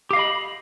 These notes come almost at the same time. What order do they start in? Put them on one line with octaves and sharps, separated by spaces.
G4 F5 D#5 B5